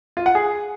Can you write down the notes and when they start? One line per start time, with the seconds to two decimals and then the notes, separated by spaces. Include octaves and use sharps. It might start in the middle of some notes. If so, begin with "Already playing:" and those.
0.17 F4
0.26 F#5
0.35 G#4